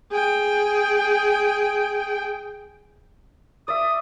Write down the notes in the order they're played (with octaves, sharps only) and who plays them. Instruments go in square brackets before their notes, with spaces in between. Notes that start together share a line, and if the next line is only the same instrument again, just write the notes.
[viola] G#4 G5
[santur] D5 E5 [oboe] D#6